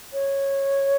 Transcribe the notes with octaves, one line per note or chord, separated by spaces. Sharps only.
C#5